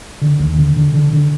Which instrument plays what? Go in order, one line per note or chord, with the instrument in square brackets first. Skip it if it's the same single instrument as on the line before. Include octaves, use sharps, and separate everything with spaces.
[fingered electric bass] D3
D#2
D3
D3
D3
D3